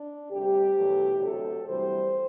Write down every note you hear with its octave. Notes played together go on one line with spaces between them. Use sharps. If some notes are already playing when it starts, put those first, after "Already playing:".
Already playing: D4
D2 C3 G3 G4
E2 B2 F#3 A3
D2 C3 F#3 A4
D2 C3 E3 G3 C5